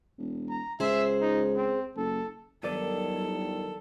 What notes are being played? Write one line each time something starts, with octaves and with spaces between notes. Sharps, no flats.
E1
A#5
C#2 G#4 C5 E5
D#4
C4
F#1 A4
G1 D#3 F#3 A4 D5 D#7